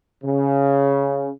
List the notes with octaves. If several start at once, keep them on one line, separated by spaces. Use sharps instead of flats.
C#3